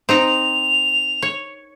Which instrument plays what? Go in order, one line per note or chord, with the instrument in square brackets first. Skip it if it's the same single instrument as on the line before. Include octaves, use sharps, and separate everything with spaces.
[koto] C4 D#4 A#5 [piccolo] F7
[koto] C#5